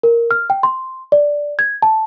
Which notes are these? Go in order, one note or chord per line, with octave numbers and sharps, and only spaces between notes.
A#4
F6
G5
C6
D5
G#6
A5